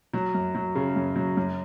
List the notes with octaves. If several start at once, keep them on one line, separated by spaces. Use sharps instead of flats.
F#3
F#2
F#3
C#3
F#2
F#3
F#2